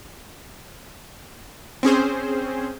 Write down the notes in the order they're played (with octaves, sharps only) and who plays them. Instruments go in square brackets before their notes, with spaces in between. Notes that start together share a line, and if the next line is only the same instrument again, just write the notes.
[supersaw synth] C4 C#4 G#4 C5